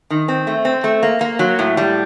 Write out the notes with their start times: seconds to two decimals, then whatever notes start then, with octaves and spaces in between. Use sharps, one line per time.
0.10 D#3
0.28 C4
0.47 A3
0.65 C4
0.84 A3
1.03 A#3
1.21 A#3
1.39 F#3
1.59 A2
1.77 G3